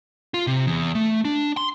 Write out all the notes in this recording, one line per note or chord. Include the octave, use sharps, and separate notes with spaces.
F4
C3
E2
A3
D4
C6